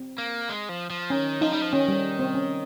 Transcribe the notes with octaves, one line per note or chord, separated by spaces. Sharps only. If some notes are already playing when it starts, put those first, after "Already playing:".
Already playing: C4
A#3
G#3
F3
F3
D#3 C#4
F3 D#4
G3
F3
D#3 C#4
G3
C4
C#4